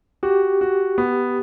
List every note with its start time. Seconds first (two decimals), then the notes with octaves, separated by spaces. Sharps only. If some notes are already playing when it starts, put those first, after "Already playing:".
0.23 F#4 G4
0.61 F#4
0.98 B3